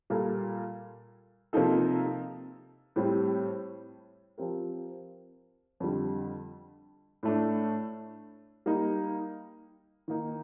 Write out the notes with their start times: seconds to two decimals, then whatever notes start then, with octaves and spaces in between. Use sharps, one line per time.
0.10 A#2 G3 A#3 F4 A4
1.53 C3 F3 A#3 D#4 A4
2.96 A2 G3 C4 G4
4.38 F3 C4 G4 A#4
5.80 F2 D3 G3
7.23 A2 A3 D4
8.66 G3 A#3 D#4
10.08 D#3 A#3 D#4